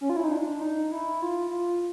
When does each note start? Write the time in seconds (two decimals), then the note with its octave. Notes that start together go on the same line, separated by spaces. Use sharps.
0.01 C#4
0.10 F4
0.17 E4
0.24 D#4
0.32 D4
0.61 D#4
0.92 E4
1.22 F4
1.51 F4